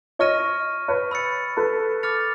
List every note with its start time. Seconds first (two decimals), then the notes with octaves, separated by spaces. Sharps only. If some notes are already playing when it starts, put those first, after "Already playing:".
0.19 C#5 D#5 C#6 F6 A#6 D#7
0.88 B4 C#5
1.11 B5 E6 A6 C#7
1.57 A4 B4
2.03 D6 F6 A6 C#7 F7